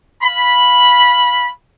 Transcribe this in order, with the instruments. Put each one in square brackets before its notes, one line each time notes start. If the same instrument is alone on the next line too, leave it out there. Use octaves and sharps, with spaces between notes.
[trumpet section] F5 B5